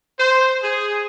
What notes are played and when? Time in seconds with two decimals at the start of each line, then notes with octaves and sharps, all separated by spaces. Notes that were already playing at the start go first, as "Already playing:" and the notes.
0.20 C5
0.63 G#4